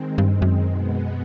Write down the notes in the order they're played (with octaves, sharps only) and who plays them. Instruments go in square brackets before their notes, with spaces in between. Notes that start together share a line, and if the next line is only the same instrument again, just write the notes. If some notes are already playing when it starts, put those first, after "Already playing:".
Already playing: [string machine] D#3 G#3 C4
[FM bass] G2
F#2
[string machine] B2 G#3 B3